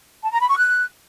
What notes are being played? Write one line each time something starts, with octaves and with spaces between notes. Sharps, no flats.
A5
A#5
B5
C#6
F#6